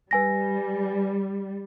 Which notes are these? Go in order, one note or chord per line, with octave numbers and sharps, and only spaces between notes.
G3 B4 G#5 A#6